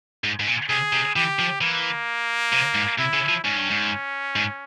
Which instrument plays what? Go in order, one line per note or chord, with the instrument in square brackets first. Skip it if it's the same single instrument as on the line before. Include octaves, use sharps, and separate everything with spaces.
[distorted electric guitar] G#2
G#2
A#2
[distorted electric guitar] C3 [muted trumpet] G#4
[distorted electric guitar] C3
[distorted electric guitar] E3 [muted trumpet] G4
[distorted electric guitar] F3
[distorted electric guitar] E3 [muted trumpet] A#3
[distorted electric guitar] C3
G#2
[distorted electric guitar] C3 [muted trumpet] E4
[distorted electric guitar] C#3
F3
[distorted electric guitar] G#2 [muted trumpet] C#4
[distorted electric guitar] G2
G#2
G#2